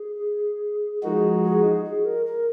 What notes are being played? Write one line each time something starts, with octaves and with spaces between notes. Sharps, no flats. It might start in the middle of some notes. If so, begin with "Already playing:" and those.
Already playing: G#4
F3 G#3 D#4 F#4 G#4 A#4
G#4
G#4
A#4
A#4